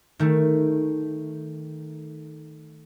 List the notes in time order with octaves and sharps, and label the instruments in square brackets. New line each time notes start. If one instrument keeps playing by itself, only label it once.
[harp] D#3 A3